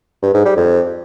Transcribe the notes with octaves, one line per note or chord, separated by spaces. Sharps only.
G2
G#2
G3
F2